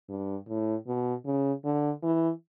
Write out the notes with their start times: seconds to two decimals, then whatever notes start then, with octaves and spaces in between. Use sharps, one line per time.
0.09 G2
0.48 A2
0.87 B2
1.25 C#3
1.64 D3
2.03 E3